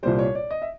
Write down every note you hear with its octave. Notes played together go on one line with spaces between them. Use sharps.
C2 A#2 G3 C5
C#5
D5
D#5
E5